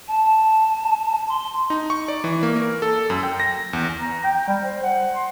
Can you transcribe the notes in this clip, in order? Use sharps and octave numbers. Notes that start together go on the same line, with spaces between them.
A5
C6
D#4
C#6
D5
E3
A#3
A#4
A4
F#2
G5
A#6
E2
A#5
G5
G3
C5
F#5
C6